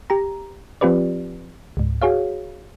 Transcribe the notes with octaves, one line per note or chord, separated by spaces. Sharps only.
G4 A#5
F3 C4 F4 G4 B4 D5
C#2 G#2
F#4 G#4 C#5 F5